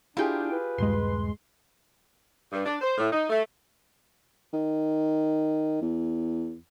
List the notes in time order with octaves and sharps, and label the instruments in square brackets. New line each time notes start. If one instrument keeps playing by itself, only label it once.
[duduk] D4 [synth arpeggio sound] E4 G5 [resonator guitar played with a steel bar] F4 G4 G#4
[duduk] B4
[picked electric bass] D#1 G2 [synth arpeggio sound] G#3 C6
[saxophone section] G2
D4
C5
A2
D#4
A3
[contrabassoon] D#3
E2